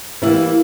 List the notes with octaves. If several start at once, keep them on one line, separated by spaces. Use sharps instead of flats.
D3 E3 G3 A#3 E4